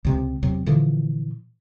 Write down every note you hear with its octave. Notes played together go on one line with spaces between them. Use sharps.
C#2 C3 G#3
E2 C3 F#3
A#2 D3 E3 F3